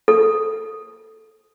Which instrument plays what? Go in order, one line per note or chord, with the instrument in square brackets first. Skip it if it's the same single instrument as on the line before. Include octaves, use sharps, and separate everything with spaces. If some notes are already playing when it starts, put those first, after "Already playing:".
[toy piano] A4